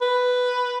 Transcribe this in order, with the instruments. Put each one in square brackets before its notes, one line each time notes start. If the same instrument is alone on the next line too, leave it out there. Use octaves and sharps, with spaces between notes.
[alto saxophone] B4